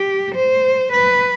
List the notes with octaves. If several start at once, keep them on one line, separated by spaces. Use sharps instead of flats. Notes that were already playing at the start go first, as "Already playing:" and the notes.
Already playing: G4
C5
B4